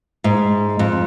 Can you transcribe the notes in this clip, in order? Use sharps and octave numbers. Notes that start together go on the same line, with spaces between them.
G#2
F2